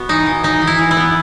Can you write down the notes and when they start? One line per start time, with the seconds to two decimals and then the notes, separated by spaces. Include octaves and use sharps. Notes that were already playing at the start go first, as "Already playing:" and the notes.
Already playing: B3 F#4
0.09 E3 D#4
0.26 E3
0.44 E3 D#4
0.62 E3
0.67 E4
0.79 E3
0.91 E4
0.97 B3